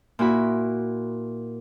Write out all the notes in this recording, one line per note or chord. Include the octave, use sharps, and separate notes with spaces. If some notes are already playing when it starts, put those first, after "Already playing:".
A#2 E4 F#4 B5